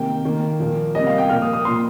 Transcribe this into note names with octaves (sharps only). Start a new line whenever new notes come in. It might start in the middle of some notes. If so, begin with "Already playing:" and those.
Already playing: C3 D#3 A#3 G5
D#3 A#3
A#2 F3 A#3
C3 G3 A#3 D#5
F5
G5
A#2 F3 A#3 F6
D#6
D#6
A#2 A#3 C6